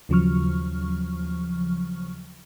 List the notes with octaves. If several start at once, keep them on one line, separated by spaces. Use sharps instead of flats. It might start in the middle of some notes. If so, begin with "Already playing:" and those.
D#2 C#3 F3 F#3 C#6 F6